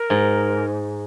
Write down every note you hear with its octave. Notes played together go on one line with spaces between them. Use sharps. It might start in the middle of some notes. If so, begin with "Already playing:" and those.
Already playing: A#4
G#2